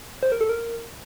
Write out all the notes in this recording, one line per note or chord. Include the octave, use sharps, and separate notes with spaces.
C5
A#4
A4
A#4